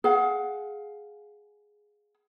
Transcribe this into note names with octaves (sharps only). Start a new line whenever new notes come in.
G#4 F5 F#5